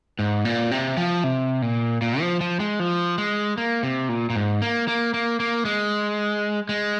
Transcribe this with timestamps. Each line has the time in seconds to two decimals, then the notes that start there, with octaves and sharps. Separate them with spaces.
0.19 G#2
0.45 A#2
0.71 C3
0.97 F3
1.24 C3
1.62 A#2
2.02 A#2
2.20 F3
2.41 F3
2.60 G#3
2.80 F3
3.18 G#3
3.58 A#3
3.83 C3
4.09 A#2
4.30 A#2
4.36 G#2
4.62 A#3
4.88 A#3
5.14 A#3
5.40 A#3
5.65 G#3
6.69 G#3